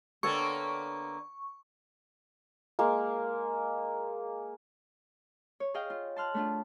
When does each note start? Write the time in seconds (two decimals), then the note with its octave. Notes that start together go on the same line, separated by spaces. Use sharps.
0.23 D3 A#3 B3 A4 C#5 G5 C#6
2.79 G#3 A#3
5.60 C#5
5.74 G#4 D#5 F5 G5
5.90 F4
6.16 A5 C6 F6 F#6
6.34 A3 D4 F4